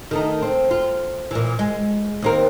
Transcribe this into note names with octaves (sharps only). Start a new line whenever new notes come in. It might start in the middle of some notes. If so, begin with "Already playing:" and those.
D#3 A3 D#4
C4
F4
A#2 E3
G#3
D#2 C4 A#4